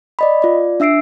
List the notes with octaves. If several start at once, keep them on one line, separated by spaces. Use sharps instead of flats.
D5 D#5 B5
F4 D5
D4 E5 E6 C7 D7